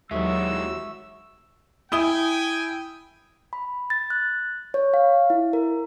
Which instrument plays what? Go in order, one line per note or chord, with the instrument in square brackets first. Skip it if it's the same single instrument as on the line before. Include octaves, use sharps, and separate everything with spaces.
[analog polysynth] D#2 F#3 [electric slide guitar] E3 G#3 [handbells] E5 C#6 [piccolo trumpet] E6
[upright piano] E4 D#6 G7 [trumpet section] G5 G#5
[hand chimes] B5
A6
F#6
C#5
F5
E4
A#4